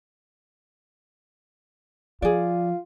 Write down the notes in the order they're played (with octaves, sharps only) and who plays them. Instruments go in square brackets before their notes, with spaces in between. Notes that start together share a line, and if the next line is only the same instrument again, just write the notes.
[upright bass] F3 [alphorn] F4 [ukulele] G#4 D5